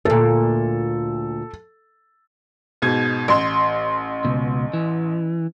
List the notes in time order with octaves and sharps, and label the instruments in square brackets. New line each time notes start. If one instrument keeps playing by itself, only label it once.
[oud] D2 A#2 [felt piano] A4
[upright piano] G#2 B2 G#6
A1 C6
[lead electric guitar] C#2 B2
E3